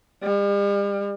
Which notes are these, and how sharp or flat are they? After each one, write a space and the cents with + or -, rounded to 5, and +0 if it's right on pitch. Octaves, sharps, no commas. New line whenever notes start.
G3 +45